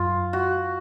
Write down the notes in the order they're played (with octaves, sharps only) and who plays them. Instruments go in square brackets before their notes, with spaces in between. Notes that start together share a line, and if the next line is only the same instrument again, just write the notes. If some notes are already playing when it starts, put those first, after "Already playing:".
Already playing: [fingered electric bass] F#2 [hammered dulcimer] F4
[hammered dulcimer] F#4